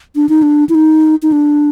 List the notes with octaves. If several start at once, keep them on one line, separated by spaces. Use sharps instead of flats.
D4
D#4
D4
E4
D#4
D#4
D4